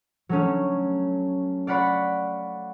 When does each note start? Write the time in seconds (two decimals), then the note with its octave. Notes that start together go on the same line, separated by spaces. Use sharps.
0.29 F#3 A3 C#4
1.67 D5 F5 F#5 B5 C#6